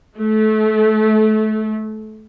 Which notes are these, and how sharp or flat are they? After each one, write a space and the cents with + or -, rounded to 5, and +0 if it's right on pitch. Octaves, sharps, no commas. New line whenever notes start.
A3 -25